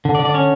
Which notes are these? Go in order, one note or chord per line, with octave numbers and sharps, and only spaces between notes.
D3
D5
D3
D5
C#4 C#5